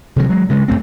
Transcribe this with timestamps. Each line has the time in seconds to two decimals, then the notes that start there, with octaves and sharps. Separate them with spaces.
0.16 C3 D#3 F#3
0.29 F#3 G#3
0.49 G2 C#3 G#3
0.68 F#2 A2 A3 C4